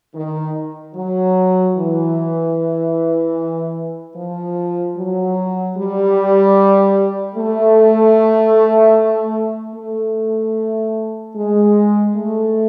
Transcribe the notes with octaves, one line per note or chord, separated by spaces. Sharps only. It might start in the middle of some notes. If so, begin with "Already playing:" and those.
D#3
F#3
E3
F3
F#3
G3
A3
A3
G#3
A3